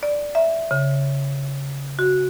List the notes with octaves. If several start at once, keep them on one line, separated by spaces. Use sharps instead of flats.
D5
E5
C#3
F#4